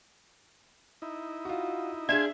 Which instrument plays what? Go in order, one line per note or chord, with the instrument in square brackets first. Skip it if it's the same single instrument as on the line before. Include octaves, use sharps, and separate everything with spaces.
[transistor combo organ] D#4 E4
[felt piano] F4 F#4
[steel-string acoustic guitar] D4 G#4 [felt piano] E5 E7 [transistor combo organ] F5 G#5 C6 [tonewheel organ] G#6